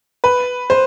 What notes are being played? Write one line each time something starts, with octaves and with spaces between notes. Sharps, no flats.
B4
C5